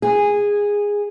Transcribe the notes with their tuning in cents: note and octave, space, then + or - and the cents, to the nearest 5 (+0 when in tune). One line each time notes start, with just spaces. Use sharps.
G#4 -15